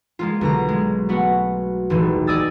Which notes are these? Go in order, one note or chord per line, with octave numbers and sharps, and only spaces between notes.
G#3 A#3 F4
B1 D3 A#5
G#3
A3 B3 F#4
D#1 G#1 E3
D5 D#5 G#5 D#6 E6 A6